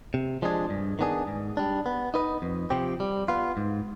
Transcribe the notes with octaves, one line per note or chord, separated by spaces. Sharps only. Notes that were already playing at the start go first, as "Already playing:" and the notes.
C3
F3 G#3 D4 G#4
G2
D#3 B3 D4 G#4
G#2
G3 D4
B3
D#4 B4 D#5
F2
C3 F3 C4 G4
G3
B3 F4
G#2